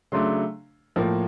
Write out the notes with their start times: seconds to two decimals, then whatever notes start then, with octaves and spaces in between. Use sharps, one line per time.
0.12 C#3 F#3 A3 D4 C6
0.96 A2 F3 A#3